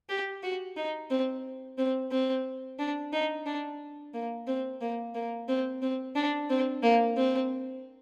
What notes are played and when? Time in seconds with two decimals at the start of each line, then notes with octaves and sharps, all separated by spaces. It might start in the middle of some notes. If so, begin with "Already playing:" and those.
0.09 G4
0.43 F#4
0.76 D#4
1.11 C4
1.78 C4
2.11 C4
2.79 D4
3.13 D#4
3.46 D4
4.14 A#3
4.48 C4
4.81 A#3
5.15 A#3
5.49 C4
5.82 C4
6.16 D4
6.50 C4
6.83 A#3
7.17 C4